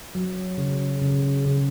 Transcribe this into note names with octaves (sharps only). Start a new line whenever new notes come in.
F#3
C#3
C#3
C#3